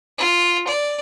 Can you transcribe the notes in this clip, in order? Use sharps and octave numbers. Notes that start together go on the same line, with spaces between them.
F4
D5